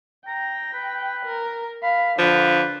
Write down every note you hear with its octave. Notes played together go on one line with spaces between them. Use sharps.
G5 A#5
B4
A#4
F5 B5
D3 F3 B4